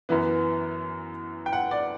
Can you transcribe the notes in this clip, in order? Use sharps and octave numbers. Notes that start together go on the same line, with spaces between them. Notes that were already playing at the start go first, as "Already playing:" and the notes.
F#2 E3 B3
G5
F#5
D5